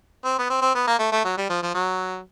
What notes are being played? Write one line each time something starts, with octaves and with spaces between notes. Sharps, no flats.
C4
B3
C4
C4
B3
A#3
A3
A3
F#3
G3
F3
F3
F#3